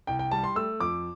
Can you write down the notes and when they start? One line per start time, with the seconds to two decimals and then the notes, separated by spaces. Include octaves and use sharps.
0.07 C2 G5
0.19 G5
0.32 G3 A5
0.44 C6
0.56 A3 E6
0.80 F2 D6